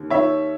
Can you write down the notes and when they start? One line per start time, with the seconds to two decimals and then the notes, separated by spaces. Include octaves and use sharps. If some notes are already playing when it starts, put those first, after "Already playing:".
Already playing: D#2
0.10 D#3 C#5 E5